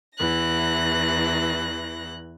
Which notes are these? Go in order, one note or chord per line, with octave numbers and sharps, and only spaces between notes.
E2 E3 F#6 A#6